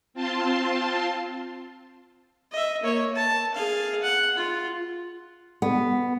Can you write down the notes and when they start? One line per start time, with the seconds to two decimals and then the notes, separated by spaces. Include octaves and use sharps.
0.14 C4 F4 A5 C6
2.52 D#5 E5
2.83 A#3 C#5
3.16 A5
3.55 G#4 F5
4.03 F#5
4.36 F4
5.62 B3